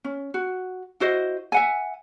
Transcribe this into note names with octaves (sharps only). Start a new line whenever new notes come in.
C#4
F#4
E4 F#4 C5 D#5
E5 F#5 G#5